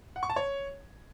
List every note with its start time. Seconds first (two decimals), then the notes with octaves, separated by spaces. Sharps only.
0.16 F#5
0.23 C#6
0.30 A5
0.36 C#5